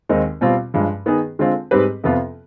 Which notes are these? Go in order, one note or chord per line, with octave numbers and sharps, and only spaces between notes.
D#2 D#3 G#3 C4 D#4
B2 G3 C4 F4
G2 F3 G#3
D#3 B3 D#4 G#4
D3 G#3 C4 F4
G#2 G3 C4 G4 B4
F2 C3 F3 B3 F4